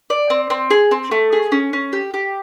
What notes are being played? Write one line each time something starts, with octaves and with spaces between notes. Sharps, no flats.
D5
C4
C4
G#4
C4
A3
G#4
C#4
C#4
G4
G4